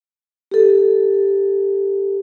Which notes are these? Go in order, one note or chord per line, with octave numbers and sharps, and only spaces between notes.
G4 A4